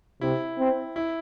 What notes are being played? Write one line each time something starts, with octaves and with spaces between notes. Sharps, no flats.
C3 E4
C4
E4